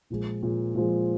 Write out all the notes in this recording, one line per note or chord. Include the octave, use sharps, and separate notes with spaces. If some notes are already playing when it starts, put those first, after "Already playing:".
A#2 F3 G#3
A#2 F3 G#3
A#2 F3 G#3